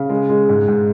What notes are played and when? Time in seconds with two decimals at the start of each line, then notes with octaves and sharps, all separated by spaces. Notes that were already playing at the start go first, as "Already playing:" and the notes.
Already playing: C#3
0.10 G#3
0.29 G#3
0.49 G#2
0.68 G#2